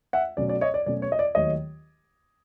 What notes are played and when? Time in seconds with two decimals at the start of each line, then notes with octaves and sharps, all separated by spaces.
0.13 E5 F#5
0.37 B2 F#3 A3 C#4 D5
0.49 D5
0.61 C#5 D#5
0.74 D5
0.86 B2 F#3 A3 C#4 D5
1.02 C#5
1.12 D#5
1.19 D5
1.35 D#2 D#3 F#3 A3 C#5 D#5